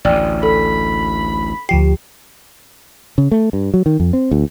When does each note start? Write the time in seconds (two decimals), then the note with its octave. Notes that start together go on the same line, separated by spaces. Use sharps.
0.05 A1 D2 D5 G5
0.43 A4 B5
1.69 D2 F3 G4 C7
3.18 C#3
3.31 A3
3.53 G2
3.74 F#3
3.86 D#3
4.00 F2
4.13 C4
4.31 D2